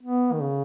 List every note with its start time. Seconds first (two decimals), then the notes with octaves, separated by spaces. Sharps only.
0.03 B3
0.32 D#3
0.40 C#3